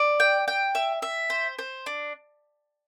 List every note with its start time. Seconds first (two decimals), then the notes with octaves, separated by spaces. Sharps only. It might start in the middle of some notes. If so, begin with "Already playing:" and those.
Already playing: D5
0.20 G5
0.48 G5
0.75 E5
1.02 E5
1.30 C5
1.59 C5
1.86 D4